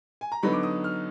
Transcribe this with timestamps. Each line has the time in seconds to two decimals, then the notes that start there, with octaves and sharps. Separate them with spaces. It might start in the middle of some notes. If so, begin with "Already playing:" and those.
0.21 G#5
0.32 A#5
0.43 D3 F#3 B3 D#4 B5
0.53 D6
0.63 D#6
0.84 F6